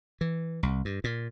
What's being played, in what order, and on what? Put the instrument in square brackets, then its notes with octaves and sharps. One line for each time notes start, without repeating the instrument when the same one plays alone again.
[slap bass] E3
C2
G2
A#2